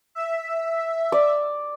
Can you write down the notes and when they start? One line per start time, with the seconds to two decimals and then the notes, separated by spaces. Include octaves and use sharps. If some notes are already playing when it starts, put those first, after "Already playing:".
0.15 E5
1.12 D5